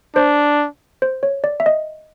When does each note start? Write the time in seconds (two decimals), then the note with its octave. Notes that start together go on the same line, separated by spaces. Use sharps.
0.16 D4 C5
1.02 C5
1.23 C#5
1.44 D5
1.60 E5
1.66 D#5